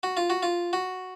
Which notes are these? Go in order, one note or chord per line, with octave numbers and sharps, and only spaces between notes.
F#4
F4
F#4
F4
F#4